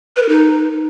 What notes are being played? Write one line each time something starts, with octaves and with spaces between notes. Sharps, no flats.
B4
A#4
D#4